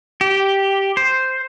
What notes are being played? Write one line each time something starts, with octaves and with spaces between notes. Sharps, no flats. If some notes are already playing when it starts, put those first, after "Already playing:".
G4
C5